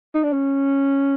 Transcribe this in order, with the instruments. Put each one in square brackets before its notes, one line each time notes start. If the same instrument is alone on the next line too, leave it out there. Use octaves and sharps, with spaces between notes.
[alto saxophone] D#4
D4
C#4